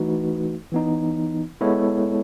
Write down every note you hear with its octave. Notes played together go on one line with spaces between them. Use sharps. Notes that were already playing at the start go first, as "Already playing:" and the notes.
Already playing: E3 A3 D#4 F#4 B4
E3 B3 D#4
G#3 B3 E4 A4 C#5